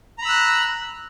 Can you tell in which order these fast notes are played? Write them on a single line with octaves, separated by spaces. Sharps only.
A#5 B5 E6 F#6